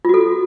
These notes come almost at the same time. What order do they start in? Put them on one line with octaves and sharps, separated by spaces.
F4 F#4 A4